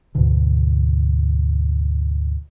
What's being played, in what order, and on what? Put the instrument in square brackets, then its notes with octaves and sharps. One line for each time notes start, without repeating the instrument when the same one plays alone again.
[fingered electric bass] D2 G#2 B2 D3